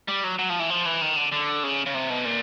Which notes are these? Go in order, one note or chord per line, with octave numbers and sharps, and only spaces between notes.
G3
F#3
F#3
F3
E3
F3
E3
D#3
D3
D3
C#3
C#3
C3
B2
A#2